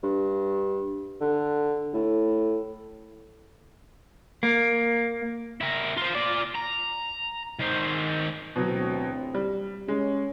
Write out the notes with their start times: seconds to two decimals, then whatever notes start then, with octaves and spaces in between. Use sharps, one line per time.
0.03 G2
1.21 D3
1.93 A2
4.43 A#3
5.61 E4 A#4
5.97 F4 C5
6.15 F4 D5
6.55 A#5
7.60 D#3 C5
8.56 A1 D2 B2 F#3 C4
9.35 G3
9.88 G#3 C#4